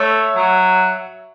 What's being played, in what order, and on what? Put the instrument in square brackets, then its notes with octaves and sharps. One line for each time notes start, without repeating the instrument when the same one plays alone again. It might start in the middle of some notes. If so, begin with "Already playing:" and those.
Already playing: [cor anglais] A3 [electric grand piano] C#5 E5
[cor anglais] F#3